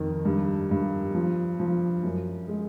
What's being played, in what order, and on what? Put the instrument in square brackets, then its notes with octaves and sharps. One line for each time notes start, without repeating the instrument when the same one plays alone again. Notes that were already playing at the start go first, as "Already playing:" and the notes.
Already playing: [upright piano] F2 D#3
G2
G2
F3
F3
F#2
G#3